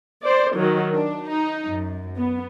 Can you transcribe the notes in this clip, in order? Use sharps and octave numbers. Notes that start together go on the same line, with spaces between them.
C5 D5
D#3 F#3
D4
D#4
F#2
B3